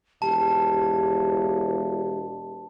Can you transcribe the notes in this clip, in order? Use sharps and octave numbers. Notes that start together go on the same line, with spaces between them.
E1 G4 A5